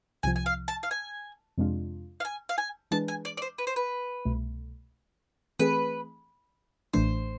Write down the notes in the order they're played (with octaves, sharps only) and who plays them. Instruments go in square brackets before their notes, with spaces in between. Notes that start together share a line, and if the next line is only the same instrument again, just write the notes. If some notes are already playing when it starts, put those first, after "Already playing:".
[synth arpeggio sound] C2 C3 F3 [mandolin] G#5
[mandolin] G#5
F5
A5
F5
G#5
[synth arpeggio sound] F2 C3 G#3 D4 F4
[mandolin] F5
G#5
F5
G#5
[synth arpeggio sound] E3 G#3 D4 G#4 B4 [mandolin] A5
[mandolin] G#5
D5
D5
C5
B4
C5
B4
[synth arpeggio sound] C2 B2 A3
[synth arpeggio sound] E3 A3 C4 G#4 [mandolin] B4
[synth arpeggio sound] A1 A2 E3 A3 D4 [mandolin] C5